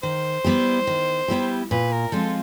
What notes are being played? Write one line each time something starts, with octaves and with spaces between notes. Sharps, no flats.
D#3 C5
G3 B3 E4 G4
D#3
G3 B3 E4 G4
A#2 B4
A#4
F3 G#3 C4 F4 A4